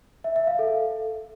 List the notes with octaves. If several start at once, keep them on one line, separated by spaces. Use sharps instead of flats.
E5
E5
F5
A4